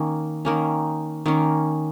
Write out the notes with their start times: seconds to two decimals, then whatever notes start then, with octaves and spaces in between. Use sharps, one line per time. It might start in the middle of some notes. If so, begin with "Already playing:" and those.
Already playing: D#3 A#3 C#4
0.45 D#3 A#3 C#4
1.26 D#3 A#3 C#4